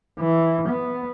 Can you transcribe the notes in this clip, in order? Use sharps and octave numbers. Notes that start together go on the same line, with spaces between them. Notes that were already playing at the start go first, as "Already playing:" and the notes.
E3
B3